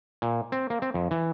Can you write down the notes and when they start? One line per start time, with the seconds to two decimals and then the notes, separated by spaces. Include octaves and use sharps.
0.22 A#2
0.52 C4
0.70 A#3
0.82 C4
0.94 F2
1.11 E3